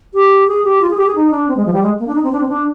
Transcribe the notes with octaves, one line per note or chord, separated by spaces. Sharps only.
G4
G#4
G4
F4
G#4
G4
G#4
D#4
D4
C4
G#3
F3
G3
G#3
A#3
D4
D#4
C4
D4
C4
D4